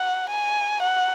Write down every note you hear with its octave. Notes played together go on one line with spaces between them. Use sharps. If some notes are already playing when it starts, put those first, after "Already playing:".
Already playing: F#5
G#5
F#5